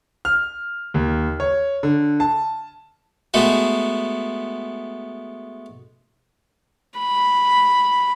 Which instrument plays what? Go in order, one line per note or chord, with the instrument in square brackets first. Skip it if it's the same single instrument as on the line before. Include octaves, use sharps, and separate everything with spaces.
[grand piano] F6
D#2
C#5
D3
A5
[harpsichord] G#3 A3 B3 F#4
[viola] B5